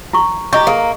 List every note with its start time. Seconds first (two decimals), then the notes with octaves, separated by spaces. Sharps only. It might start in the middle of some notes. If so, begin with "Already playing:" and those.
0.13 E4 C#6
0.53 E4 G4 D#5 C#6
0.67 A#3 G#4 A4